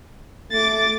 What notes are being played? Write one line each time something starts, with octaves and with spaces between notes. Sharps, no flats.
A3 D6 A6